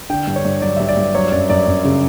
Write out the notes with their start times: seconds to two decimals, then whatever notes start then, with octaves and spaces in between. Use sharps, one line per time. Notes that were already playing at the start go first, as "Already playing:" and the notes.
0.10 D3 G5
0.27 G2
0.36 C#5
0.45 G2
0.62 F#3 D5
0.76 G2 E5
0.89 D5
0.97 G2
1.14 F#3 C#5
1.32 F#2 D5
1.50 F#2 D5
1.67 F#2
1.84 C#3